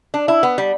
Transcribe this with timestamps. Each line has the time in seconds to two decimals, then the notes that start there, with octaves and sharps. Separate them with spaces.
0.14 D4
0.28 E4
0.43 B3
0.58 G3